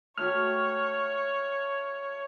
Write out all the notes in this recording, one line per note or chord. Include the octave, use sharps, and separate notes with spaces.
A3 F#4 G4 C#5 F6